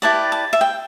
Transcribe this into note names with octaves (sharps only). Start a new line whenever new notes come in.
E4 G4 B4 D5 A5
A5
E5
G5